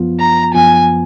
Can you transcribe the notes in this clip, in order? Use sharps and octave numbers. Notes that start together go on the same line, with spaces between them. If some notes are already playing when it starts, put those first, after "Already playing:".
Already playing: F#2 F3 B3 F4
A#5
F#2 F3 B3 F4 G#5